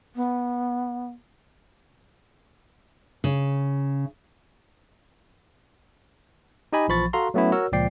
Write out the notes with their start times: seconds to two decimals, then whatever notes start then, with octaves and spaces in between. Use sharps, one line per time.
0.16 B3
3.24 C#3
6.73 D#4 G4 D#5 G#5 B5
6.88 A#1 E3 F3 B5 C#6 A6
7.13 F#4 A4 F5 A#5 C6
7.34 F#3 A3 B3 C#4 E4
7.52 F#4 A#4 C#5 E6
7.72 C#2 A#2 F3 D5 G5 C7